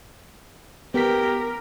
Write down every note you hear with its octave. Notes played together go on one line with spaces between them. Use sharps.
B3 G4 A#4 B6